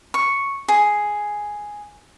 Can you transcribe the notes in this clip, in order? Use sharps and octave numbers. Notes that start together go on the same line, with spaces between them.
C#6
G#4